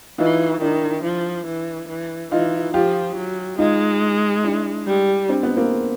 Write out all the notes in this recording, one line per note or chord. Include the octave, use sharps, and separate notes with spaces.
E3 D#4 F4
D#3 D4 E4
F3
E3
E3
E3 D#4 F4
F3 F4 G4
F#3
G#3 D#4 F4
D4 E4
G3
C4 D4
B3
A#3 C4